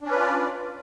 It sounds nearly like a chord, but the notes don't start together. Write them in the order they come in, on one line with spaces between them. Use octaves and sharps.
D4 C#4 B4 F4 D5